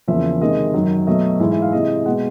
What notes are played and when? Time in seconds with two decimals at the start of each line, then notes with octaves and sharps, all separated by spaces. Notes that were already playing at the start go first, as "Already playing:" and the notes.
0.08 E2 C#3 F3 A#3 E5
0.41 C3 D#3 G#3 D#5
0.74 F#2 D#3 F#3
1.07 B2 F#3 A3 D#5
1.40 G#2 E3 G#3 E5
1.51 E5
1.62 F5
1.72 C3 E3 G#3 D#5
2.05 B2 G#3 F#5